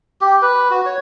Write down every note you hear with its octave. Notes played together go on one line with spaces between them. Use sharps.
G4
B4
F#4
C#5